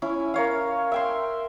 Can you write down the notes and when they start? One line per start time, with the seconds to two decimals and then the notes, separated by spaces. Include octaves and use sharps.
0.02 C#4 E4
0.34 A#4 C#5 F5
0.92 E5 G5 C6